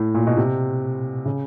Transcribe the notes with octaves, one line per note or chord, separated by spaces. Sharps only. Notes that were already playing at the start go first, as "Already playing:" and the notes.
Already playing: A2
A#2
B2
C3
C#3